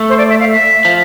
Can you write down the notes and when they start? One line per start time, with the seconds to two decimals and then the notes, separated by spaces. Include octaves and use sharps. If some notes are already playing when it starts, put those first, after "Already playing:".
Already playing: A3
0.09 C5
0.18 D5
0.30 E5
0.40 F5
0.52 E5
0.85 F3